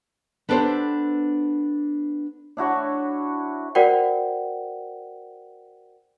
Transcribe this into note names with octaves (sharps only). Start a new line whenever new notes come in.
B3 D4 G4 A4 B4 C5
D4 E4 F#4 C#5
F#4 A#4 C5 D5 F#5 G5